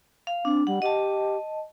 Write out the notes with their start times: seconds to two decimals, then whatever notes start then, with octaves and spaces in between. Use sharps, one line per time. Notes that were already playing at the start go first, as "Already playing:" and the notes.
0.27 F5
0.45 C4 D4
0.67 G3 F#5
0.82 G4 D#5 A5